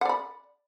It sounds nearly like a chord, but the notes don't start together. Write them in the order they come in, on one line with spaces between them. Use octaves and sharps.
F#5 D5 B5